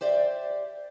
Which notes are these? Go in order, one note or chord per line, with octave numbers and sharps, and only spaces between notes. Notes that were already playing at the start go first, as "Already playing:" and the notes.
G4 C5 D5 E5